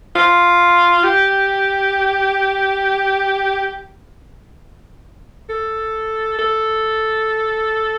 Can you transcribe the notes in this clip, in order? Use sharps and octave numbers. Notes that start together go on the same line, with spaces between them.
F4
G4
A4
A4